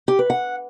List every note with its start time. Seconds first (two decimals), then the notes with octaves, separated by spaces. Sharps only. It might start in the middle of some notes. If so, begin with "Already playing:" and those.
0.08 G4
0.19 B4
0.30 F#5